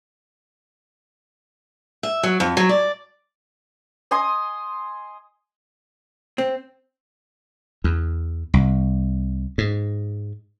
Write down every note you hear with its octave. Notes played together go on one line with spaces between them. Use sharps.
E5
F#3
F2
F#3
D5
D#5 G#5 C6 D#6
C4
E2
C2
G#2